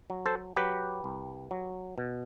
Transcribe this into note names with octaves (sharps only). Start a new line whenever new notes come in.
F#3
A4 C5
F#3 G4 B4
C2
F#3
B2